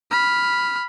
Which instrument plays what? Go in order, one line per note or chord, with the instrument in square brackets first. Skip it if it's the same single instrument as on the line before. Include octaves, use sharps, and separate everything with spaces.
[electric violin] B5 F6